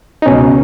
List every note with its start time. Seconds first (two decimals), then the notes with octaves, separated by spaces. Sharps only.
0.22 D#4
0.26 C#2 B2 C#4